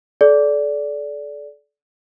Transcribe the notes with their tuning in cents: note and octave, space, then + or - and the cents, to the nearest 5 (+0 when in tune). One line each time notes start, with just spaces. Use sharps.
A4 -35 D5 -15